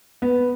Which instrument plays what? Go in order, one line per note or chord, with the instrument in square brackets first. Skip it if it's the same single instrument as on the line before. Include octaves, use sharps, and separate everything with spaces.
[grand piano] B3